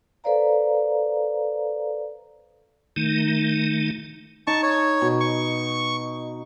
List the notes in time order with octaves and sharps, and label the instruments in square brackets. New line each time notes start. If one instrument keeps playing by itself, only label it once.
[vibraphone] A4 B4 C5 D5 F5 A#5
[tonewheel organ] D#3 A3 D#4
[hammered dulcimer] D#4 [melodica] A5 C#6
[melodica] C#5
[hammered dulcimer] B2
[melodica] C#6